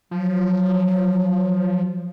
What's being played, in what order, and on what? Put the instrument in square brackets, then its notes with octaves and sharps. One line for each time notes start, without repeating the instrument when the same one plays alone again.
[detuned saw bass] F3 [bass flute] F#3